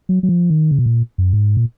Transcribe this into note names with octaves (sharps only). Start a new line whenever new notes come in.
F#3
F#3
F3
D#3
C#3
B2
A#2
F#2
G#2
A#2